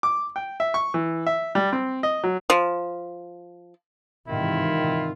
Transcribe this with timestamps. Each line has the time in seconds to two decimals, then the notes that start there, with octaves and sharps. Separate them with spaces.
0.03 D6
0.36 G5
0.60 E5
0.74 C#6
0.94 E3
1.27 E5
1.55 G3
1.73 C4
2.03 D#5
2.24 F#3
2.50 F3
4.28 G#2 C3 D#3 E3 E4 F4